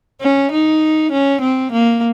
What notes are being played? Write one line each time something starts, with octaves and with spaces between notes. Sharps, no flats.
C#4
D#4
C#4
C4
A#3